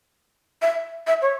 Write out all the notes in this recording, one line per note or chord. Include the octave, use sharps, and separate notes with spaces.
E5
E5
C#5